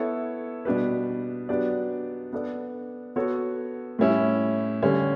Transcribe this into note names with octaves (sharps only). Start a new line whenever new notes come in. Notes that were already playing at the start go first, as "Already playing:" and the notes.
Already playing: B3 E4 A4 C#5
B2 G3 D4 G4 B4
F#3 B3 D4 G4 D5
B3 D4 A4 D5
B3 F#4 A4 C#5
A2 G3 C#4 E4
D3 G3 C#4